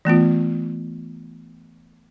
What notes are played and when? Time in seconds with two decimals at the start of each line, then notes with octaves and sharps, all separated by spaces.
0.05 E3 A3 B3 F4